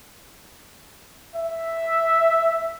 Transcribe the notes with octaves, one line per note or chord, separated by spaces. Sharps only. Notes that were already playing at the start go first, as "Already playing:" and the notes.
E5